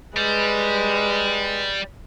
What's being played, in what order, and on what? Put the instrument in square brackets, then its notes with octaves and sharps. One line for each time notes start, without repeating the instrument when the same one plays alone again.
[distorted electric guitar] G3 [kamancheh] G#3 B4